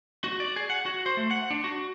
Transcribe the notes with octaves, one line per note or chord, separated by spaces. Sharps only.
F#4
D5
G#4
F#5
F#4
C5
A3
F#5
D4
F#4